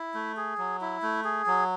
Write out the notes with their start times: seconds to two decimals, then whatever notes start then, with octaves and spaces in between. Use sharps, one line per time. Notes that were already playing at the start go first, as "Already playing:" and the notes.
Already playing: E4
0.14 A3
0.37 G#4
0.58 F#3
0.81 E4
1.02 A3
1.24 G#4
1.47 F#3